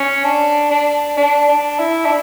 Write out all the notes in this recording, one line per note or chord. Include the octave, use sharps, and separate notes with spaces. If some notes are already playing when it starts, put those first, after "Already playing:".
Already playing: C#4
D4
D4
D4
D4
E4
D4